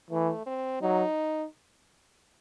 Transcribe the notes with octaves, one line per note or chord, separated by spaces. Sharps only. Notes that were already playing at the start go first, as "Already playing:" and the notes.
E3 A3
C4
F#3 D#4